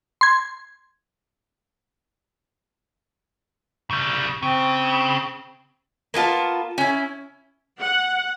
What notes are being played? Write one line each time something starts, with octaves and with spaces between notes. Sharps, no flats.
C6 G#6
C#3 G3
C#3 C4
A#3 B3 F4 A5
C#4 E4
F#5